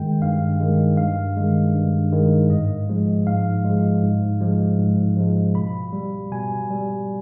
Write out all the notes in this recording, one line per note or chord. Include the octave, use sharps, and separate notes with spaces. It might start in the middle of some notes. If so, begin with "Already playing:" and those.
Already playing: G2 D#3 G#3 G5
G2 F5
D#3 G#3
G2 F5
D#3 G#3
G2
D#3 G#3
G#2 D#5
F3 G#3
G#2 F5
F3 G#3
G#2
F3 G#3
G#2
F3 G#3
B2 B5
G3
B2 G#5
G3